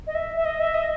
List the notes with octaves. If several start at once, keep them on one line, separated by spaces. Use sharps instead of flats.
D#5
E5
E5
D#5
E5
D#5